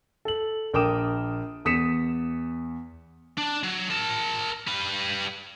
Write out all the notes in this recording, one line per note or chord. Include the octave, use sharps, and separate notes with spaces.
A4 F#7
A#1 A#4 G5 D6 D#6 E7
E2 D#6 B6 C#7 E7
D4
F#3
A#4 A5
G3 B4